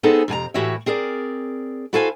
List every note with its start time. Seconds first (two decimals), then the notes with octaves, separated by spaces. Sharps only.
0.03 B3 C4 D#4 G#4 A4 C5
0.28 F2 C3 G#5 A#5
0.54 A2 E3 F#4 G4 C#5 E5
0.86 C4 G#4 A#4 D5
1.93 E4 F#4 A4 C5 F5 G#5